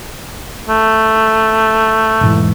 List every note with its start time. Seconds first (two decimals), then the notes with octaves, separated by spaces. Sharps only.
0.69 A3
2.21 E1 G#2 E3